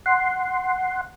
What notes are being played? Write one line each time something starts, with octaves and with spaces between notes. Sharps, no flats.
F#5 C6